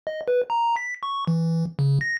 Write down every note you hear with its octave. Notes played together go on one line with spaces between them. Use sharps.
D#5
B4
A#5
B6
C#6
E3
C#3
A#6